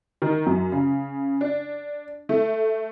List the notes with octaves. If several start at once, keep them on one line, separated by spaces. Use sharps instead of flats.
D#3
F#2
C#3
D4
A3